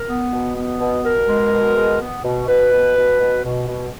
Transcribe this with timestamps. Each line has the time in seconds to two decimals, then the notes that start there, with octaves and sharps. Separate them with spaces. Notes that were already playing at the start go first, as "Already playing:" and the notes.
Already playing: A#4
0.08 B3
0.33 B2
0.56 B3
0.81 B2
1.05 B2 A#4
1.29 G#3
1.53 B2
1.77 G#3
2.01 B3
2.24 B2
2.48 B2 B4
2.73 B2
2.96 B2
3.21 B2
3.45 B2
3.68 B2